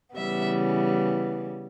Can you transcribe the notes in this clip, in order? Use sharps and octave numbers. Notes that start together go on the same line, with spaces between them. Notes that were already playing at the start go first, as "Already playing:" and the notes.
C#3 E3 G3 B3 E5